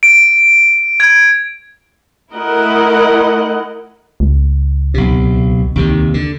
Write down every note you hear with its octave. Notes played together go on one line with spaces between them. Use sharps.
D7
G#6
A3 E4 A#4 D#5 F#5
C#2
B1 C3
D#2 C3 D#3
D3